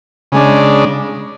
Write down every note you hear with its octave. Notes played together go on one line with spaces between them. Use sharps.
C#3 G#3 D4